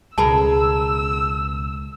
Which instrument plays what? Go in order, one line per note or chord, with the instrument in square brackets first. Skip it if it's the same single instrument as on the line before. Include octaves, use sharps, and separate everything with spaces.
[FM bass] C#2 [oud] B2 G#4 A#4 [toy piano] A5 B5 [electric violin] E6